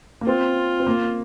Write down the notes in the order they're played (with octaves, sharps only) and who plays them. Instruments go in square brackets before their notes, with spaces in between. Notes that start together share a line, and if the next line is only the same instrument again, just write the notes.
[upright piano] A#3
[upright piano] C4 [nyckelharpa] F4
[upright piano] C4
A#3